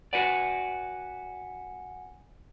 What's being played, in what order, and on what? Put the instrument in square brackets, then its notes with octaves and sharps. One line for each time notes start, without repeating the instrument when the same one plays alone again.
[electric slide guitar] F#4 B4 D5 [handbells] F#5 G#5 C#7